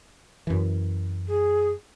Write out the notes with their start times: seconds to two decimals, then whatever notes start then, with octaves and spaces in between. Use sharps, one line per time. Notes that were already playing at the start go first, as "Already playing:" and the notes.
0.47 F#2 E3
1.28 G#4